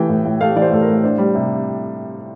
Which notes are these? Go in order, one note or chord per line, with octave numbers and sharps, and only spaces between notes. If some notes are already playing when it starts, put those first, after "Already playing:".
Already playing: E3 A3 G5
A2
A2
A3 F5
E3 D5
C5
A2 A4
A#4
A2
D4 C5
G3
C3